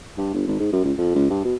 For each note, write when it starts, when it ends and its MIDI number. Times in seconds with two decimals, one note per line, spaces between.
0.17 0.32 43
0.34 0.45 31
0.47 0.57 32
0.59 0.70 44
0.72 0.81 42
0.84 0.93 37
0.98 1.10 41
1.15 1.27 37
1.30 1.43 43
1.44 1.55 47